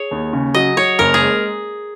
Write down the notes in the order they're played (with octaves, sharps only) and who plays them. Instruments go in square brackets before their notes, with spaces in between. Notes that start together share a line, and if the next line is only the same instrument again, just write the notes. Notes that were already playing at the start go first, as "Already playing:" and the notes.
Already playing: [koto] G#4 C#5
[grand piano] D#2
C#3
[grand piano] F#3 [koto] D#5
[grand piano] F#3 [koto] C#5
[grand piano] F#1 [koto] A#4
[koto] G#4
[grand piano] G#3